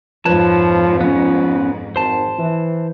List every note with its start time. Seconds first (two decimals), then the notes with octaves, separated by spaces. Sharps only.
0.25 F2 G#2 F3 B4 C#5 A5
1.01 F3 B3 C#4
1.96 G#1 C5 A5
2.39 E3